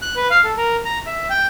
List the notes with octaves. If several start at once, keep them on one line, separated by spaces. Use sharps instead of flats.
F#6
B4
F5
A4
A#4
A#5
E5
G5